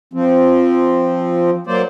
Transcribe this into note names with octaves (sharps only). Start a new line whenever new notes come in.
F3 C4
F#3 A#3 C5 D5